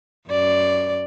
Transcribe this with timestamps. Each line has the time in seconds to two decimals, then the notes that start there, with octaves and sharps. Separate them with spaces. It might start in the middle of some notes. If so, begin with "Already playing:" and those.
0.28 F#2 D5